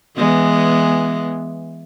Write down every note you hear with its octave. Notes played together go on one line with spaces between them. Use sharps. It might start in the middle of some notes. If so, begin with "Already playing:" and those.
E3 G#3 B3